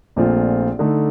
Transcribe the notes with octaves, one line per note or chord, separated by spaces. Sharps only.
A#1 A#2 A3 C4 F4
D3 A3 D#4